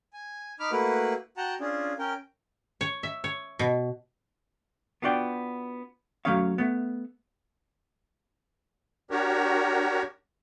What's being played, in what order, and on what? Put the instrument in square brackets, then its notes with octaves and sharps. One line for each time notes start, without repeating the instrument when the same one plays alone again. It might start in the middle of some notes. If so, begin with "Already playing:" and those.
[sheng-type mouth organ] G#5
D#4 B5 D6 F6
A3 A#3 E4 F#4 B4
F#4 F#5 G5 A5 A#5
C#4 D4 F4 G#4
C#4 A#4 G5
[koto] C#5
E5
C#5
B2
[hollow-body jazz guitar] B3 D4 F4 F#4 D5 G5
F#3 A3 C#4 C#5 F5
A3 B3
[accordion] D4 F#4 G4 A#4 C#5